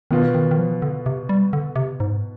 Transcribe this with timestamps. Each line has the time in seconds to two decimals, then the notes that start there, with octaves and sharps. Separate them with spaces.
0.11 B2 D#3 B3 F4
0.35 D#3
0.51 D#3
0.58 F3
0.82 D3
1.06 C3
1.29 G3
1.53 D3
1.76 C3
2.00 G#2